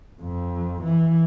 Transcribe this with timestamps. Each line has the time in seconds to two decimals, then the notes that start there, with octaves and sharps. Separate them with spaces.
0.21 F2
0.83 E3